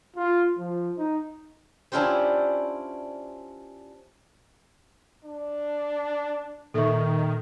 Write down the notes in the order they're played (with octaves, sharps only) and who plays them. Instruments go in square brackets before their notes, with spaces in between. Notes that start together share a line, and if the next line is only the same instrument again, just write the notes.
[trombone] F4
F3
D#4
[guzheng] C#4 D4 E4 F4 G4 C5
[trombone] D4
[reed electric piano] A#2 [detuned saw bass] D#3 [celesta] A4 E5 C#6